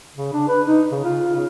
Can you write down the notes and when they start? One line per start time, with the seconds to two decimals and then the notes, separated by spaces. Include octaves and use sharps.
0.16 C#3
0.33 D4
0.48 B4
0.66 D#4
0.91 C#3
1.04 F4
1.35 C#3